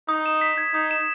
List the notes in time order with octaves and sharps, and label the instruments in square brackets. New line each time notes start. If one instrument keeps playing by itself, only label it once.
[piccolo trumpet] D#4 [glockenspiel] D#6
[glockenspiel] E7
B6
G#6
[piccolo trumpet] D#4 [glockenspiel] D#6
[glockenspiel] E7